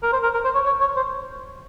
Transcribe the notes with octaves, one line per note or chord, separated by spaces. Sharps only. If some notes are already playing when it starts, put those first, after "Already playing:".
A#4
C5
A#4
A#4
C5
C#5
C#5
C#5
C5